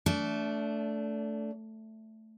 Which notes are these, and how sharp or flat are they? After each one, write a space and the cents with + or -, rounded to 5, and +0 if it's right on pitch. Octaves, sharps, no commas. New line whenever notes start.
A3 +0 D4 -25